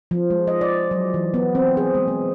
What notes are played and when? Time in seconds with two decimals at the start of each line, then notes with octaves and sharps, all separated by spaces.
0.11 F3
0.30 G#3
0.47 D#5
0.61 D5
0.91 F#3
1.14 E3
1.34 B3
1.55 C4
1.77 G#4
1.95 G#3
2.08 B3